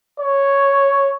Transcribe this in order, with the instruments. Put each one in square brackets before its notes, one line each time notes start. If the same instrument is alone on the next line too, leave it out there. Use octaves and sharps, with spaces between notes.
[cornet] C#5